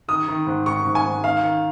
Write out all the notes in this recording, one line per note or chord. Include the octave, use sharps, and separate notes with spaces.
D#3 D#6
D#3
G#2
D#3 C#6
G#2
G#5
G#2
D#3 F5
D#3